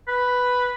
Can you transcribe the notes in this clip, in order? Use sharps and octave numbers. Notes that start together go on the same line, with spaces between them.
B4